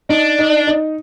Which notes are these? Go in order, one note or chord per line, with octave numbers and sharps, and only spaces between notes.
D4 D#4
D#4
D#4